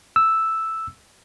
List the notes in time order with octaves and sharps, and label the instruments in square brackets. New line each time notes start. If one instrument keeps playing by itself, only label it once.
[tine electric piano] E6